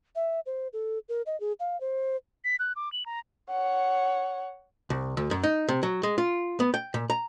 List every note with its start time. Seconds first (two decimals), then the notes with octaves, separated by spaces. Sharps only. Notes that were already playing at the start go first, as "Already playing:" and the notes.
0.15 E5
0.46 C5
0.73 A4
1.09 A#4
1.26 D#5
1.40 G#4
1.60 F5
1.81 C5
2.45 B6
2.59 F#6
2.76 D6
2.93 F#7
3.06 A#5
3.50 C#5 F#5
4.90 C2
5.17 D2
5.31 F#2
5.43 D#4
5.69 C3
5.83 F#3
6.03 G#3
6.18 F4
6.60 B3
6.74 G5
6.94 A#2
7.10 A#5